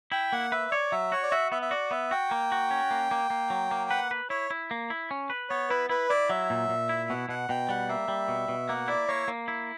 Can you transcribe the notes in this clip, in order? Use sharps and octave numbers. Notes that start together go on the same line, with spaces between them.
E4 G5
A#3 F#5
B4 E5
C#5 D5
F#3 E5
F#4 C#5
D5
F#4 E5
B3 E5
E5
F#4 D5
B3 E5
F#4 G5
A#3
F#4
C#4
A#3
A#3
A#3
F#3
A#3
B4 F#5
B4
E4 C#5
E4
A#3
E4
C#4
B4
B3 C#5
E4 B4
E4 B4
E4 D5
F#3 E5
A#2
A#2
E4
B2 F#5
B2 F#5
B2 G5
G3 F#5
A#3 E5
G3
B2
B2
A#3 F#5
E4 D5
A#3 C#5
A#3
E4